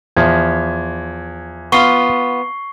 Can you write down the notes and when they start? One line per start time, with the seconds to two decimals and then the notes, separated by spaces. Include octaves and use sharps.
0.17 E2 F3 G#6
1.72 B3 F4 C#6 C7 G7